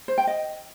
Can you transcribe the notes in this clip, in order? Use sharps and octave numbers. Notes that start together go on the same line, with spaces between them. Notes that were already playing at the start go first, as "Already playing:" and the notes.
C5
G5
D#5